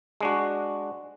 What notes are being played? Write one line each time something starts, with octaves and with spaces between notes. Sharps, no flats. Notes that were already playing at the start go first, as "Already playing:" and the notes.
G#3 D4 F#4